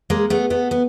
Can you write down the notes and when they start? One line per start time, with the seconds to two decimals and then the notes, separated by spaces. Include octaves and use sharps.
0.10 G#3 A#3
0.30 A3 B3
0.50 A3 B3
0.71 B3